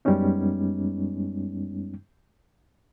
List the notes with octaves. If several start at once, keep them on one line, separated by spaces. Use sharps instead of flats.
F#2 G3 G#3 B3 C#4 D#4